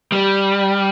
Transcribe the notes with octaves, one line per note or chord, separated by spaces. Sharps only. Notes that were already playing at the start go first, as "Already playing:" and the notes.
G3